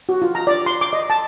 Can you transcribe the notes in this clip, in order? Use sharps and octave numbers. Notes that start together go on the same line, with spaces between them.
F#4
F4
A#5
D5
C6
D6
D#5
A5